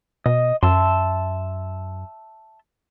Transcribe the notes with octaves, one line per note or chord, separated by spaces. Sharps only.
B2 D#5
F#2 E5 A5 C6